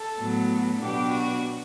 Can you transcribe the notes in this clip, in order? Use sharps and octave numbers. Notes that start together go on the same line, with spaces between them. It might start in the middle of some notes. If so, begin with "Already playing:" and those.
Already playing: A4
A2 F#3 B3
B2 F#3 B3 D4 G4
F#4